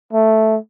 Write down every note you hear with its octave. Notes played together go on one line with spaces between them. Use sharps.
A3